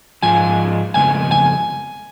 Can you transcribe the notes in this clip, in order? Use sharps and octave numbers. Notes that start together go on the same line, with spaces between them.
G#2 F3 G#3 F4 G#5
F2 C#3 G#3 B3 G#5
G#5